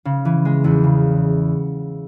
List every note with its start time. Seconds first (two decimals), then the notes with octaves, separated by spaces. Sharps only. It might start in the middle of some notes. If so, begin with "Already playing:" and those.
0.05 C#3
0.25 E3
0.45 G#3
0.64 E2
0.84 C#3